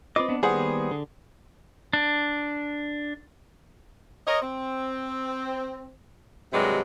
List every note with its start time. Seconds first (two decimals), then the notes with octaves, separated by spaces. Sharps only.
0.16 C4 F4 B4 D#5 D6
0.29 B3 D4
0.43 D#3 G3 A#3 B3 G#4 B4 C5 F#5
0.91 D3
1.93 D4
4.27 A#4 C#5 D#5
4.42 C4
6.53 G2 C3 D#3 F#3 G#3